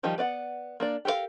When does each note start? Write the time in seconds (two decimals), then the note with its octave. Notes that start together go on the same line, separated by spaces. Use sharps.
0.03 D#3 F3 G3 D#4 G4
0.18 B3 D5 F5 F#5
0.80 A#3 D4 D5
1.05 G4 A4 A#4 C5 F5